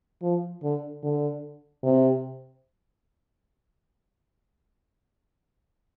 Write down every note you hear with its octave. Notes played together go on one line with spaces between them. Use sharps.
F3
D3
D3
C3